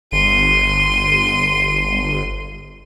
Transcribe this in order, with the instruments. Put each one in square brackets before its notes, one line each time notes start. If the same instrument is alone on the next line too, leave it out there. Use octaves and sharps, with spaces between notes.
[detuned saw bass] G1 [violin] C6 D#7